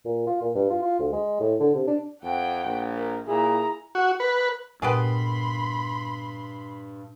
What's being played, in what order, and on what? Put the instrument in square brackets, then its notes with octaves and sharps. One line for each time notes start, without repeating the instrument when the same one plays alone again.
[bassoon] A#2
F4
A#2
G2
F4
F4
D2
G#3
A2
D3
C3
D4
[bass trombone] F2 [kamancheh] F#5 G5
[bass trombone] A#1
[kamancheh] A#4
[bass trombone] A#2 [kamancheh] E4 A#5 [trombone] G#4
[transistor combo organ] F#4
B4
[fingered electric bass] G2 [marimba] A#2 [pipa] B3 G4 G#4 [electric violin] B5 C6